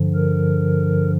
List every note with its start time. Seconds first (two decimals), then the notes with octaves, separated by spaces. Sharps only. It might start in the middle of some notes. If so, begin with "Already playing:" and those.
Already playing: G2 D3 F3
0.15 A#4